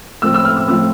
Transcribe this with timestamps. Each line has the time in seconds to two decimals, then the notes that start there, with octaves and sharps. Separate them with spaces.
0.22 A2 F3 C4 E6
0.34 E6
0.45 F6
0.57 E6
0.68 A2 F3 C4 E6